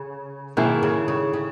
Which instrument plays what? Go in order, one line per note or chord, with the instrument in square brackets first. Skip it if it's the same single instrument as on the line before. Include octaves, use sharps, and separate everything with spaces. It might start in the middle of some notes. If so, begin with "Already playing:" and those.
Already playing: [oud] C#3
[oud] B2 [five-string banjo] D#3 A#3 E4 G#4
[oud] C#3
C#3
C#3